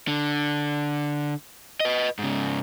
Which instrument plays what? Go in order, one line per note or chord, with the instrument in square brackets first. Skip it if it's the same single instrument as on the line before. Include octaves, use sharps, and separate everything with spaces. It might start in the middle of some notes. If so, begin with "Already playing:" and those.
[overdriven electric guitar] D3
B4 D#5
G#2 C#3